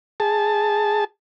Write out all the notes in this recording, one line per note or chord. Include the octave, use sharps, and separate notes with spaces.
G#4 A5